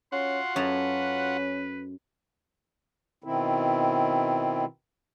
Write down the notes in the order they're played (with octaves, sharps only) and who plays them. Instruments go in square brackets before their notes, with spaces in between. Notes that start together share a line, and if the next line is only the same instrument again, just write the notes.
[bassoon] C#4 [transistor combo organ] F4 F#4 F#5 [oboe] C6
[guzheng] F#2 A4 A#5 [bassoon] C#4 [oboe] B4
[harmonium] B2 D#3 C4 E4